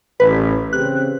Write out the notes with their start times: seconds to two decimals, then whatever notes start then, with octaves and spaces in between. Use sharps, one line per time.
0.20 A1 B4
0.73 C#3 C4 G4 F#6